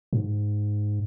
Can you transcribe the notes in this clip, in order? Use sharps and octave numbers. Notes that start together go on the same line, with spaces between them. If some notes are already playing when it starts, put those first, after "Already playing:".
G#2